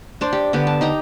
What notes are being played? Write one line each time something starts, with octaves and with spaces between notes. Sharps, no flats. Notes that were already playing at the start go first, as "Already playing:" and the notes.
D4 C5 D5
G4
D3 B3 G4 D6
A5
D#4 G4 A#5